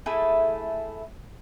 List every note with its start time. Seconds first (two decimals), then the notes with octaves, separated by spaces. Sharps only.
0.06 A3 E4 G#4 A4